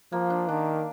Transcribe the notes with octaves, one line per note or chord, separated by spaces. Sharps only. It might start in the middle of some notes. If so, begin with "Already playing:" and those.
F3 A#3
D4
D#3 D4